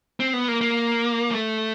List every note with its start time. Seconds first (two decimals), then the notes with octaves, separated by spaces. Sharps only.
0.20 C4
0.33 B3
0.48 A#3
0.61 A#3
1.31 A3